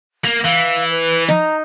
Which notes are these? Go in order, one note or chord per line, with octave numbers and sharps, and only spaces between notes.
A#3
E3 F5
B4
D#4 A#5